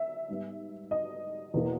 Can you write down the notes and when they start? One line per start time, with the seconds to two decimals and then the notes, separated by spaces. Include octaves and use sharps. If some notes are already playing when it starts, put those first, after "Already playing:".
Already playing: E5
0.28 G#2 G3 B3
0.91 D#5
1.54 E2 B2 A#3